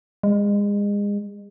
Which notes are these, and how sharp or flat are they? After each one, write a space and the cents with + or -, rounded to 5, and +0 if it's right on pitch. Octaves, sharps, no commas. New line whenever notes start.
G#3 -30